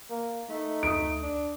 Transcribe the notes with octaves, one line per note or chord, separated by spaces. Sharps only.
A#3
A3 D#4
D2 D#6 D7
D4